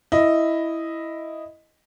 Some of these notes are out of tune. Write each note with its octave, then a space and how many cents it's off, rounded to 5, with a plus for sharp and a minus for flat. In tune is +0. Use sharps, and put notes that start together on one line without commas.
E4 +0 D#5 +0